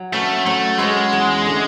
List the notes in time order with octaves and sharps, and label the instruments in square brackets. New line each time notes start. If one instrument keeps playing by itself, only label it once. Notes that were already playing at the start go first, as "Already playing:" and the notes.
Already playing: [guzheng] F#3
[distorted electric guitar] A3 [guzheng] C#4 F#4 B4
[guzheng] F#3 [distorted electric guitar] A3
[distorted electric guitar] G#3 [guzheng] C#4 F#4 B4
[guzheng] E2
D3 A3